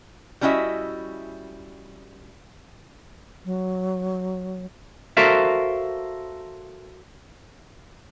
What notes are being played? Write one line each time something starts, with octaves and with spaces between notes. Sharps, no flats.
G3 C#4 E4 F#4 D#5 E5
F#3
F#4 A4 A#4 C5 E5 F5